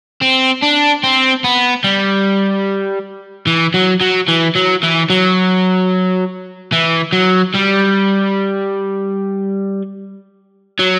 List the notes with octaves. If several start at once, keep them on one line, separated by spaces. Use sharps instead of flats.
C4
D4
C4
B3
G3
E3
F#3
F#3
E3
F#3
E3
F#3
E3
F#3
G3
F#3